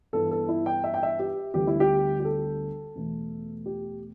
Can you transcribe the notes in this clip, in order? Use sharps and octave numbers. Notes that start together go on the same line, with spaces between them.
G2 E3 B3 A4
A4
E4
G5
E5
G5
E5
G4
D2 D3 G3 B3 G4
E4
G4
G4
A4
E2 B2 A3
G4